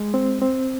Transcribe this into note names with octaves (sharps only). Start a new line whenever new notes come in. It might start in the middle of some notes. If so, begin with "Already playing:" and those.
Already playing: G#3
C4
C4